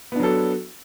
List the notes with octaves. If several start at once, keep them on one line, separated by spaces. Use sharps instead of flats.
F#3 B3 D4 A4